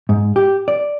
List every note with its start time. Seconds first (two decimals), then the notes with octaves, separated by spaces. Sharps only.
0.09 G#2
0.36 G4
0.68 D5